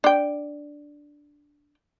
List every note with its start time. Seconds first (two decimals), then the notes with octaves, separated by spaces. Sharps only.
0.04 D4 G5